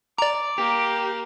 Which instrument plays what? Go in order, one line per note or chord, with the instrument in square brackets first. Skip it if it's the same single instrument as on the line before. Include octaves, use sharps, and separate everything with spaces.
[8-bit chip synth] D5 A#5 [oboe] D6
[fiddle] A#3 [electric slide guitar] G4